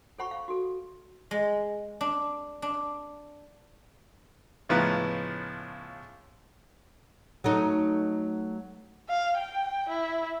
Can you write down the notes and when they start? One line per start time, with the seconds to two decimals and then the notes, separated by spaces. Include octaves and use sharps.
0.19 A4 C5 F#5 B5 C#6
0.31 F5
0.48 F#4 A4
1.31 G#3
2.01 D4
2.62 D4
4.69 C#2 A2 F3 B3 B4 A#5
7.44 F#3 A3 D#4
9.09 F5
9.37 G5
9.89 E4